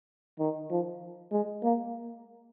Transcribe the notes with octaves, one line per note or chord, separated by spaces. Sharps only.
D#3
F3
G#3
A#3